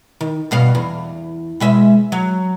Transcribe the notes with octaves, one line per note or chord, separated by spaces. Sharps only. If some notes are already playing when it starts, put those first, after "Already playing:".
D#3
G2 B2 F5
E2
B2 G#3 E5
F#3